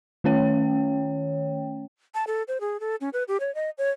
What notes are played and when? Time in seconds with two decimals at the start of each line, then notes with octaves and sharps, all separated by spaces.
0.24 D#3 A3 C#4 C#5 G5
2.14 A5
2.27 A4
2.48 C5
2.61 G#4
2.80 A4
3.01 C#4
3.13 B4
3.28 G4
3.40 C#5
3.55 D#5
3.78 C#5